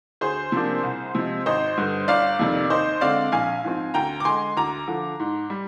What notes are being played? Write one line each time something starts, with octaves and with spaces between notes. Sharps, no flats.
D2 G#4 C5
C3 F3 A#3 D4
C2
C3 F3 G#3
G#1 C5 D#5
G2 D3
G1 D5 F5
F2 C3 D#3
D#2 C5 D#5
D3 G#3 C4 D5 F5
A#1 F5 G#5
G#2 F3 C4
D2 G5 A#5
D6
D3 G#3 G#5 C6
D2 A#5 D6
D3 F3
G#2
G3